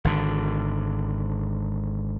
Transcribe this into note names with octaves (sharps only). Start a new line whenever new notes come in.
G#1 D3